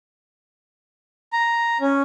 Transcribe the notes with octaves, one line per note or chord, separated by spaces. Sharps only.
A#5
C#4